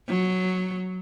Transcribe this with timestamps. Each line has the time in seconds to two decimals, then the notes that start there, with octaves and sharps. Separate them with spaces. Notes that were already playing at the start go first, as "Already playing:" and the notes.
0.08 F#3